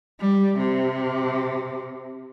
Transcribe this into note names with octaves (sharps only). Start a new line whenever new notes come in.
G3
C3